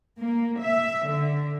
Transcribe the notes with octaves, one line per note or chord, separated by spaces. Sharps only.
A#3
E5
D3